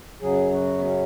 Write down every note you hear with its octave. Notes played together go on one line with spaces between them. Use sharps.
F#2 C#3 F#3 G#4
F#4
B3
C#4